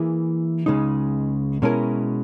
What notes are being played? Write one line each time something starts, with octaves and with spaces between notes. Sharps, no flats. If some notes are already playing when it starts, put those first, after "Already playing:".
Already playing: E3 A#3 E4 G#4 B4
C#2 C#3 G#3 D#4
B2 G#3 C#4 E4 A#4